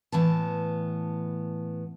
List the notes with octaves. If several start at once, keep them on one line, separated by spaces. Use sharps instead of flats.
A2 E3 B3 A5